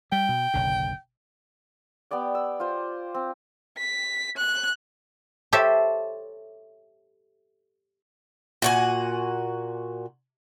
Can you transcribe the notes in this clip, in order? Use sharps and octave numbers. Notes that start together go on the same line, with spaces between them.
G3 G5
B2
F#1 B1 D3
B3 G4 D5 G5
E6
F4 C5
C4
B6
F#6
G4 A4 C5 C#5 E5
A#2 F#4 G#5